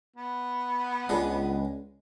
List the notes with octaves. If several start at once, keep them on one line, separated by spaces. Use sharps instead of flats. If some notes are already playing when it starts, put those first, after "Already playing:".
B3
C#2 G#3 D4